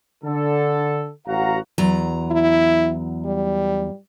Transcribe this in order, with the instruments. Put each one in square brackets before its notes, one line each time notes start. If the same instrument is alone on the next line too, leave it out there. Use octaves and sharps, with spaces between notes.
[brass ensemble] D3 A4
A1 F#4 F5 F#5 A#5
[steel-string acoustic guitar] E2 F#3 A#5
[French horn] E4
G3